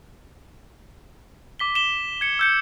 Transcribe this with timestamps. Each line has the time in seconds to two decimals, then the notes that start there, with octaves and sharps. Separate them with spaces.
1.59 D6 B6 G7
1.75 E7 G7
2.21 G#6 C#7
2.39 E6 G6 C#7